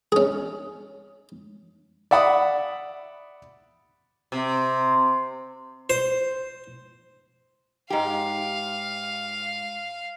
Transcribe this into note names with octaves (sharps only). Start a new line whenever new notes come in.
C#4 G#4
D5 E5 F#5 B5 D#6
C3
C5
G#2 G4 F5